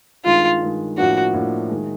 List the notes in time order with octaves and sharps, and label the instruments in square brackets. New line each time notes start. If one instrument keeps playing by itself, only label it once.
[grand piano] G2 D#3 G#3 [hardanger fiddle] F4
[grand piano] G2 D#3 G#3
[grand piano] A2 F3 A#3 D4 [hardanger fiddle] F#4
[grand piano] A2 F3 A#3 D4
D#3 G#3